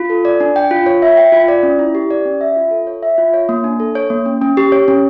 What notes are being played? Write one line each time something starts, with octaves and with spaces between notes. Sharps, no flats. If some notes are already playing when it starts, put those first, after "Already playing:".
Already playing: F4
A4
D5
D4
G5
F4
C#5
E5
G5
F4
D5
C#4
E4
G4
D5
C#4
E5
F4
A4
C#5
E5
F4
C#5
A#3
D4
A4
C#5
A#3
C#4
C#4
G4
C#5
C#4